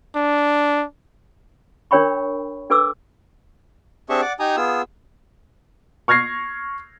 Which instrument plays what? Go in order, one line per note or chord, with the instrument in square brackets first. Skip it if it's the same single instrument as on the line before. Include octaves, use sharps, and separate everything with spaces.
[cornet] D4
[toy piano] D4 A#4 C#5 G5 B5 C#6
D4 A4 B4 D6 E6
[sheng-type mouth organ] C4 D4 G4 G#4 E5 C#6
D5 F#5 D6
D#4 G4 G#5 A#5 D#6
B3 F4 G#4 E6
[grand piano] C#6 F6 G#6 A#6 C7